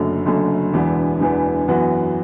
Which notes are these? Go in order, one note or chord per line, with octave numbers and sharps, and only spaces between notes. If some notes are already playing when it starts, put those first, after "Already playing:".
Already playing: F#1 F#2 D3 A3
F#1 F#2 D3 A3
E1 E2 E3 B3 D4
E1 E2 E3 B3 D4
F#2 E3 B3 F#4